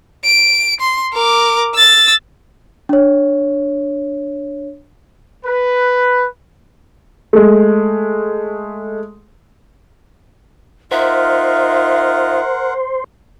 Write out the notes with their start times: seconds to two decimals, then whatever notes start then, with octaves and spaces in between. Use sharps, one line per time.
0.24 D7
0.80 C6
1.13 A#4 D6
1.75 E6 A6
2.89 D4 C#5
5.45 B4
7.33 G#3 A3
10.91 D#4 F4 A#4 C5 E5 F#5